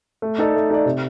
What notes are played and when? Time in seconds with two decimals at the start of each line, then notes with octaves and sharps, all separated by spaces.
0.22 A3
0.38 D#4 A4 D5
0.54 A3
0.70 D#4 A4 D5
0.85 C3